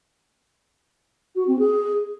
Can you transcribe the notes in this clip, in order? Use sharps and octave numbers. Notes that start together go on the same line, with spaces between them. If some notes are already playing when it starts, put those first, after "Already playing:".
F#4
C4
G#4